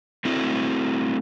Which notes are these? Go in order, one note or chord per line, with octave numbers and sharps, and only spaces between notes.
A3 C4 E4 F#4